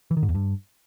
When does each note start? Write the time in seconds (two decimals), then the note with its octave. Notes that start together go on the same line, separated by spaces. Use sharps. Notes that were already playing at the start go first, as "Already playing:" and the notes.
0.11 E3
0.17 D#3
0.23 G#2
0.29 E2
0.35 G2